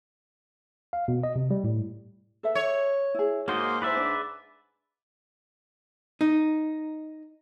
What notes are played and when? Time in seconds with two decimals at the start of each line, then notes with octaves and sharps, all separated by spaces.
0.93 F5
1.08 B2
1.23 D#5
1.36 C3
1.51 G3
1.64 A2
2.43 A4 B4 E5
2.55 C#5
3.14 E4 G#4
3.48 G#2 A#3 F#4 C5 D#5
3.82 E4 B4 C5 D5 E5
3.97 D4
6.21 D#4